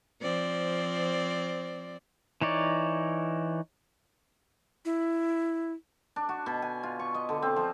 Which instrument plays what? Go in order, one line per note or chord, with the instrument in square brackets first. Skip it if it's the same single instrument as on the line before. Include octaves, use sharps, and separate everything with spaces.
[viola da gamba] F3 C4 D5
[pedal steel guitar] E3 D#4 C#5 D5
[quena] E4
[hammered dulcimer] D4
F#4
B2
G#5
F4
C#6
D#5
D3
C4
F3